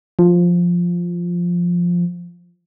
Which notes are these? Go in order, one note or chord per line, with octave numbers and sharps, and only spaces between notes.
F3